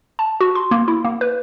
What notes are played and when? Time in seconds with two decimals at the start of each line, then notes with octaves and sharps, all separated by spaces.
0.19 A5
0.41 F#4
0.55 C6
0.71 A#3
0.88 E4
1.05 A#3
1.21 B4